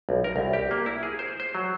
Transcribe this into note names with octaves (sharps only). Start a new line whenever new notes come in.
B1
A#4
C2
G4
A#3
E4
G#4
C5
C5
F#3